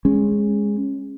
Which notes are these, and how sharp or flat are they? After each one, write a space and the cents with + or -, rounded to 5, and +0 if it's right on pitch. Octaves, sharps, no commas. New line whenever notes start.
G#3 -10 C#4 -15